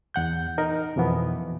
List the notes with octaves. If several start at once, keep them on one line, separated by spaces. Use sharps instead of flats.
E2 F#5 G6
D#4 A#4
F2 B2 E3 F3 B3